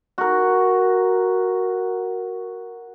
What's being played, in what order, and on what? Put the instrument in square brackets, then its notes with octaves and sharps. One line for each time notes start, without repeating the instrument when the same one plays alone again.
[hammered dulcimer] F#4 A#4